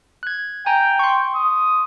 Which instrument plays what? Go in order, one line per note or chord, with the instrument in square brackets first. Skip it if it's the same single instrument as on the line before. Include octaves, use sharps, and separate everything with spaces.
[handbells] F#6 G#6
[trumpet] G5 [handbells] G#5 A#5
[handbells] C6 C#6
[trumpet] D#6